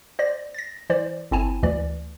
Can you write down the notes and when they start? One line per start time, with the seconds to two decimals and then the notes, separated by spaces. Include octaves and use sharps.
0.19 C5 D5 A#6
0.54 A6 A#6
0.90 E3 C5 D5
1.31 G1 C4 E4 G#5 A5
1.63 D2 E3 D5